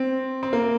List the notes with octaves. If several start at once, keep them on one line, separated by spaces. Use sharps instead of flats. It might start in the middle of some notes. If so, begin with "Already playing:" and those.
Already playing: C4
C4
A#3